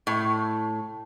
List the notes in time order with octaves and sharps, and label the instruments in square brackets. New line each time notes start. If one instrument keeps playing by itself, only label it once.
[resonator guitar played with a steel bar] A2